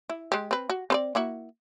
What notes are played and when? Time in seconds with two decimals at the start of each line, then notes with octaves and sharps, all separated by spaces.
0.09 E4
0.32 G#3 G4
0.51 C4 B4
0.70 F#4
0.90 C4 B4 D5
1.15 A#3 E4 F#4